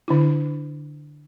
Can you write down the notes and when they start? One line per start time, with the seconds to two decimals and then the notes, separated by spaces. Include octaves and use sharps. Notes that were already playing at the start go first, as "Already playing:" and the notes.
0.08 D3 D4 E4